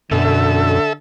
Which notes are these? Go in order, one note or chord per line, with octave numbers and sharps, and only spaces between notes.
F#2 B2 D3 A4 E5